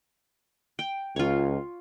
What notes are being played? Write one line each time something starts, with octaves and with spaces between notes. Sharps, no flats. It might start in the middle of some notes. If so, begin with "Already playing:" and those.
G5
C#2 F4 C#5